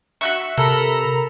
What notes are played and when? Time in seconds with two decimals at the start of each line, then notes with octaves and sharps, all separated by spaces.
0.21 F#4 E5 F#5 C#6
0.57 C3 A4 A#4 A#5 B5